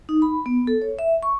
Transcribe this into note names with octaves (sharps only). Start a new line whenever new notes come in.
D#4
B5
B3
A4
C#5
E5
C#6